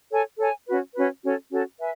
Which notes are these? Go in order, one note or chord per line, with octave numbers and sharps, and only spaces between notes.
A4 C#5 G#5
A4 C#5 G#5
C#4 F#4 B4
C#4 F#4 B4
C#4 F#4 A4
C#4 F#4 A4
B4 E5 G#5